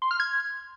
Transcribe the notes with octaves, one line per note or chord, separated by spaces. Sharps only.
C6
F6
G#6